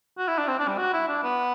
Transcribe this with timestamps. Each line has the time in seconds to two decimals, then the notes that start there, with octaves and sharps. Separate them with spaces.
0.18 F#4
0.28 E4
0.38 D4
0.48 C4
0.59 D4
0.67 G3
0.78 F#4
0.93 E4
1.08 D4
1.23 B3